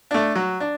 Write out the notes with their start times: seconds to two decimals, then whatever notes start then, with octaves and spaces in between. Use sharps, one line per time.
0.11 A3 D4
0.35 F#3
0.60 D4